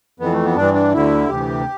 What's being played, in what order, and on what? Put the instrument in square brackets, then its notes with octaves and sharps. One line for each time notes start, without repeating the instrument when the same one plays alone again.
[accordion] F2 E3 B3
A3
B3
G2 E3 D4
D4
D2 D3 E4
D2 C3 E3 G4